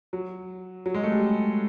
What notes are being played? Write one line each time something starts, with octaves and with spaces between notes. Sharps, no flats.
F#3
F#3
G#3
A3
G3